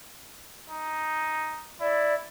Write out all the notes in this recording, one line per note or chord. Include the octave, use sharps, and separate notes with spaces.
D#4
E4 D5